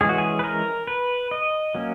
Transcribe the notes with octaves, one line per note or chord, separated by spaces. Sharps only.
E3 G#3 C#4 G#4
F#4
G#4
B4
A#4
B4
D#5
F#3 A#3 C#4